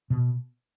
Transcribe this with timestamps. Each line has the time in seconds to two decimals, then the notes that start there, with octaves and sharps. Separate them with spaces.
0.10 B2